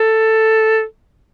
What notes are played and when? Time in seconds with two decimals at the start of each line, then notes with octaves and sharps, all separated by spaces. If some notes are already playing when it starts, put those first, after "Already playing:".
Already playing: A4